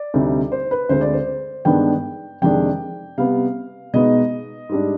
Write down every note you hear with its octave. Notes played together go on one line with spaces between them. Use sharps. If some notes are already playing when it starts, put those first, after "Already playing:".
Already playing: D5
D2 C3 G3 C4 D#4
C5
B4
D2 D3 G#3 C4 C5
D5
C5
G2 D#3 G#3 B3 D4 G5
F2 C3 D#3 G#3 D4 G5
C3 G3 B3 F5
B2 G#3 B3 D#4 D#5
G#2 G3 D4